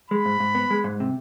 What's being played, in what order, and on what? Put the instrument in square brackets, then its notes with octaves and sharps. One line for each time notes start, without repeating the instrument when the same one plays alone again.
[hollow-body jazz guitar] G#3 [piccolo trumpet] B5
[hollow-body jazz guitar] G#2
G#2
B3
G#3
G#2
C3